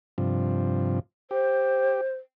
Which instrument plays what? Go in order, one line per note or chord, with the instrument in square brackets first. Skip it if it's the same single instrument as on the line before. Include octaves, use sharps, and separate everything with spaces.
[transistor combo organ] G2 C3 F3
[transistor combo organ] G4 [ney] C5